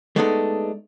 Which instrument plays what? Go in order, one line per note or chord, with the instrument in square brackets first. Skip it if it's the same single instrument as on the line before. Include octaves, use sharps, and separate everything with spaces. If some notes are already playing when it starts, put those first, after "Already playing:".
[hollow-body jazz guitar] G#3 A3 B3 D4 D#4 A4